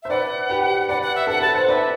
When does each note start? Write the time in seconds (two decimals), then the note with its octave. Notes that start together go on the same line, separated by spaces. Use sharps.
0.03 C5 E5
0.10 B4 D5 F#5
0.50 G4 B4
0.89 B4 D5 F#5
1.02 F#5
1.15 E5
1.27 A4 F#5
1.41 B4 A5
1.54 C5 F#5
1.68 B4 D5 E5